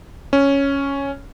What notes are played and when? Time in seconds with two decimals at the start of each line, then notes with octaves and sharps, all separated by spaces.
0.33 C#4